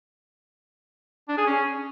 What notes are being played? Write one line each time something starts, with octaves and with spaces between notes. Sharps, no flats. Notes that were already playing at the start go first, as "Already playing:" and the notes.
D4
G#4
C#4